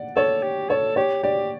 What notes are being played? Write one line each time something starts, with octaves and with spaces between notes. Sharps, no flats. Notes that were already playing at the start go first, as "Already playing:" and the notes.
Already playing: D5 F#5
A4 C#5
G4
A4 C#5
G4 C#5
G4 D5